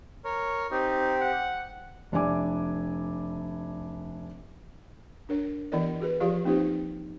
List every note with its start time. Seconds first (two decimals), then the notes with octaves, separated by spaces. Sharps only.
0.24 A#4 C#5
0.71 C4 D#4 G4
1.20 F#5
2.12 F1 D4 E4 G#5 D6
5.29 D4 A#4 C#5
5.72 E3 B3 E4 A#4 D5 D#5
6.00 F#4 G#4 B4
6.20 F3 F4 G4 D5 F5
6.45 A#3 C4 D#4 F4 G4 C5